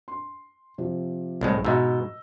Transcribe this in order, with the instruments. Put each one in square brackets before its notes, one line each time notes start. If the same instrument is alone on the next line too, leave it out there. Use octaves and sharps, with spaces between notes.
[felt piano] C6
C3 F3
[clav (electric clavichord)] C2 A2 G#3
[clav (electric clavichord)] G#2 B2 [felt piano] D#5 E6